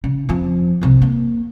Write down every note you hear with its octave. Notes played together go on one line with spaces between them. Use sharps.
C#3
F2 F3
C2 C3
A#3